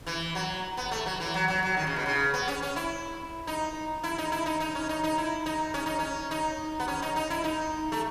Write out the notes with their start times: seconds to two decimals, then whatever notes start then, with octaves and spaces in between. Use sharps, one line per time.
0.07 E3
0.35 F#3
0.77 B3
0.91 A3
1.06 F#3
1.20 E3
1.34 F#3
1.48 F#3
1.63 F#3
1.77 D#3
1.87 C#3
1.96 B2
2.06 C#3
2.34 B3
2.48 C#4
2.63 C#4
2.76 E4
3.47 D#4
4.04 E4
4.18 D#4
4.32 E4
4.46 D#4
4.60 D#4
4.75 C#4
4.89 D#4
5.04 D#4
5.18 E4
5.46 D#4
5.74 C#4
5.86 D#4
5.99 C#4
6.31 D#4
6.80 B3
6.88 C#4
7.02 D#4
7.16 D#4
7.30 E4
7.44 D#4
7.92 A3